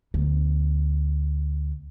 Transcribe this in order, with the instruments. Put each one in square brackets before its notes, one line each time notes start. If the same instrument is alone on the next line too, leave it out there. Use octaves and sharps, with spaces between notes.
[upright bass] D2 B3